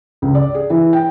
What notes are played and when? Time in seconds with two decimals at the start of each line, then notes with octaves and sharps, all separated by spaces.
0.22 C#2
0.35 D5
0.55 G#4
0.70 E3
0.93 G5